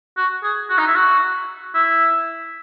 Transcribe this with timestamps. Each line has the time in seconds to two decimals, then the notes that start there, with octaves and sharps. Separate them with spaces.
0.17 F#4
0.44 G#4
0.70 F#4
0.78 D#4
0.87 E4
0.95 F#4
1.74 E4